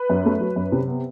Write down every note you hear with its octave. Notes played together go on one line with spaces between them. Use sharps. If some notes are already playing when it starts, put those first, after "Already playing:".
Already playing: B4
F#2
A3
F#3
F#2
C3
B3